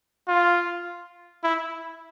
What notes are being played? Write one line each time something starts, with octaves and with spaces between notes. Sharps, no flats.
F4
E4